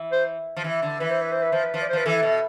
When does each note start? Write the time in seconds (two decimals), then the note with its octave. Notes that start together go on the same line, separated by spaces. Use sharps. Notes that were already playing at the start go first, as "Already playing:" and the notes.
Already playing: E3
0.12 C5
0.57 F3
0.64 E3
0.82 D3
1.00 E3 B4
1.11 C5
1.21 B4
1.32 C5
1.43 B4
1.52 F3 C5
1.64 B4
1.74 F3
1.82 D5
1.89 C5
1.93 F3 B4
2.06 E3 A4
2.23 B2